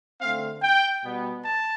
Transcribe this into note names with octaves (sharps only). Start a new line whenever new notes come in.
D3 A3 C4 F5
G5
B2 G3 B3
A5